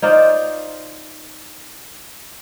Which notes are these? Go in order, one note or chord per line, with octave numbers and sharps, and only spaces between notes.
D#4 F4 C5 D5